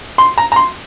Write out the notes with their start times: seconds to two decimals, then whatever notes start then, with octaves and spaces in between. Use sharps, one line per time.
0.18 C6
0.38 A#5
0.52 A#5
0.56 C6